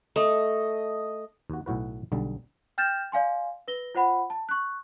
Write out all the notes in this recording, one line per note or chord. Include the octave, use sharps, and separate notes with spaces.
A3 D#5
D#2 F#4
B1 A2 F#4 B4
B1 D3 G3
G5 F6 G6 A6 A#6 E7
D5 F5 G#5 C6
B4 A#6 G7
F4 C5 F#5 B5
A5
C#6 F#6